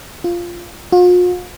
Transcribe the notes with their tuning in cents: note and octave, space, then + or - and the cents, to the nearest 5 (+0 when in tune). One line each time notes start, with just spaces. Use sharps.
F4 -10
F4 +45